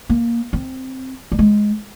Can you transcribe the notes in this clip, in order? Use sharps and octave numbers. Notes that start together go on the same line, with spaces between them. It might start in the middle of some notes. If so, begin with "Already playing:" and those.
A#3
C4
G3
G#3